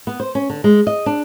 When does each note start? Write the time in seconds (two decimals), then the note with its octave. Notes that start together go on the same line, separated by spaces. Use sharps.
0.07 B3
0.20 C5
0.35 C#4
0.50 D3
0.64 G#3
0.87 D#5
1.06 D4